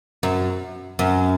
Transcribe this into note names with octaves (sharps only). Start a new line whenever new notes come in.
F#2
F#2